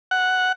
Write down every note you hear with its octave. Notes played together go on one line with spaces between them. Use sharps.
F#5